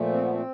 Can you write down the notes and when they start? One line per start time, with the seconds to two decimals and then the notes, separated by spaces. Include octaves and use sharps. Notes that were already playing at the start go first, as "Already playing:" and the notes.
Already playing: A#2 F3 A3
0.14 C4
0.23 B3
0.33 C4